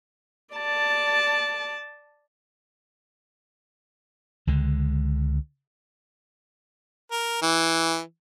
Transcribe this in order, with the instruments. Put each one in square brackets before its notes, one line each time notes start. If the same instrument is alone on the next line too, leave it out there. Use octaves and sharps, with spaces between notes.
[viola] D5 A5
[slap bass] C#2 D3 G#3
[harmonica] A#4
E3